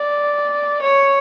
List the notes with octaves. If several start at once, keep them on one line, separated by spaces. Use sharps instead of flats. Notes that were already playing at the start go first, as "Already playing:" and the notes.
Already playing: D5
C#5